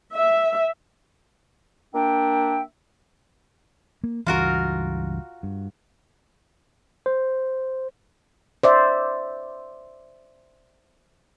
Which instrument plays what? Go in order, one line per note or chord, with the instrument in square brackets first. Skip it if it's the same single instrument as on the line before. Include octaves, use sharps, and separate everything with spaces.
[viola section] E5
[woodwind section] A#3 D4 E5 G5
[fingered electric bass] A#3
[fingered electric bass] C#2 G2 E3 [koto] F4 F#4 A#4
[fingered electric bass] G2
[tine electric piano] C5
[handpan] C5 D5 E5